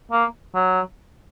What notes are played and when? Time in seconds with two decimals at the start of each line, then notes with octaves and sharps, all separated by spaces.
0.12 A#3
0.55 F#3